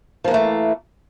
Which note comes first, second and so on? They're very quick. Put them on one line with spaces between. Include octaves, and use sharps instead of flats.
F3 A#3 E3 A3